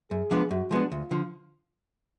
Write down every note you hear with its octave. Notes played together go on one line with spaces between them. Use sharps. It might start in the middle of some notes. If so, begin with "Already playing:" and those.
F#2 G#4
F3 G#3 B3 D4
F#2 F#4
F3 G#3 B3 D4
D2 F4
D3 F3